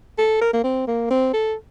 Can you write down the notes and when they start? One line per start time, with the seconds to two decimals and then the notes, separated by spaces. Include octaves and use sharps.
0.18 A4
0.41 A#4
0.53 A#3
0.64 C4
0.87 A#3
1.10 C4
1.33 A4